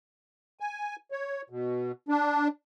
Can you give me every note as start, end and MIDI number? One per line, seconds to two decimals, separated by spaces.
0.60 0.96 80
1.12 1.42 73
1.50 1.92 47
2.09 2.48 62